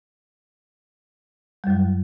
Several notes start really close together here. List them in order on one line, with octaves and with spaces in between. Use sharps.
G3 F#2 F#3